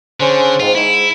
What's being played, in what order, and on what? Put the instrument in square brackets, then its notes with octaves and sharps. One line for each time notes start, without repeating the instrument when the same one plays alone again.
[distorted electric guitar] D3 [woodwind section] C#4 G#4 C5
[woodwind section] G#2 C4 [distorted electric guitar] F4
[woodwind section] G#2 [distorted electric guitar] E4